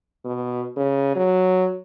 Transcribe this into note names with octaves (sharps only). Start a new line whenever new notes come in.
B2
C#3
F#3